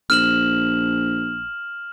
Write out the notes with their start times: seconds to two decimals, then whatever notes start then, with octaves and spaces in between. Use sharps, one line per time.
0.10 A#1 F6 E7 F#7